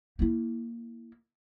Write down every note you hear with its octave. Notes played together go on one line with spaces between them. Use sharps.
A#3 E4